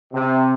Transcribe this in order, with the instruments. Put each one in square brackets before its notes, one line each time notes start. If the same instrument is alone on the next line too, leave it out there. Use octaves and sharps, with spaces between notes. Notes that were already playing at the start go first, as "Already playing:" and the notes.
[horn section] C3